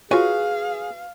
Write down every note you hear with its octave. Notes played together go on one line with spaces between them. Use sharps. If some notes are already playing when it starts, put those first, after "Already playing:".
F4 F#4 G#4 B4 C#5 F5 G#5